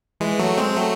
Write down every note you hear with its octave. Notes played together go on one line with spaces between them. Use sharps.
E3 G#3
F#3 A3
G#3 C4
F#3 A3